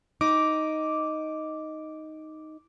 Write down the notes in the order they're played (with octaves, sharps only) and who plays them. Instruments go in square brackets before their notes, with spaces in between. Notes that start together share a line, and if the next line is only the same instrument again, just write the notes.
[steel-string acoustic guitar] D#4 [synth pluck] D6